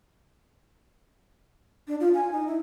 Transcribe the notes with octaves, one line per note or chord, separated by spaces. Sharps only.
D4
F4
G#5
D#4
E4